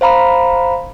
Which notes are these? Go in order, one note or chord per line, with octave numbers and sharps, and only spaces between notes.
C5 F5 A#5 B5